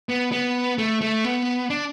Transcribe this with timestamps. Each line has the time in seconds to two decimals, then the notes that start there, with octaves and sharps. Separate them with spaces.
0.09 B3
0.32 B3
0.78 A3
1.01 A3
1.24 B3
1.70 D4